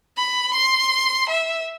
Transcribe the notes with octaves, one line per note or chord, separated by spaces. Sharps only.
B5
C6
E5